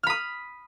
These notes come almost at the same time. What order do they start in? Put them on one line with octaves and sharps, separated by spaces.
F6 B5 D#6